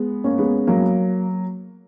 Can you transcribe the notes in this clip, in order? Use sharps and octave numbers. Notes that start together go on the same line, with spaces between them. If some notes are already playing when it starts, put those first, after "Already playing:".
Already playing: G#3 B3
A#3 C#4
G#3 B3
F#3 A#3